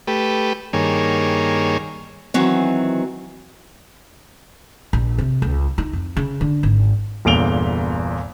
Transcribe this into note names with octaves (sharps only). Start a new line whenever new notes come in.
A3 G4 B4
G2 D#3 A#3 G#4 C#5
D#3 E3 F#3 C4
A#1
C3
C#2
D#4
F2
C#3
D3
G#1
G1 E2 A#2 D7 F7 G7